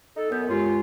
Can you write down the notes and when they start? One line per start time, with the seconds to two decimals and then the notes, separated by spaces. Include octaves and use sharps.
0.16 D#4 A4
0.30 F#2 B3 A#4 G6
0.49 G2 G#3 C#4 F4 G4